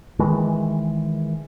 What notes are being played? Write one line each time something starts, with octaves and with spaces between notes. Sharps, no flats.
D#3 E3 G#3